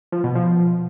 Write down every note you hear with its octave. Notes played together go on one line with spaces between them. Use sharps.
F3
B2
F3